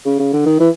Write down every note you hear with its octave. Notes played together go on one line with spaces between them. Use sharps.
C#3
C#3
D3
D#3
E3